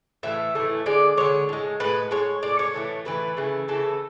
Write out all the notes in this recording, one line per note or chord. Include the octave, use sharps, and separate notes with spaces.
A2 E3 A3 E5
A2 E3 A3
D3 G#3 D5
D3 G#3 C#5
A2 G#3
A2 G#3 B4
A2 G#3 C#5
A2 G#3 D5
C#5
A2 E3 A3
A2 E3 A3 B4
C#3 E3 A3
C#3 E3 A3 A4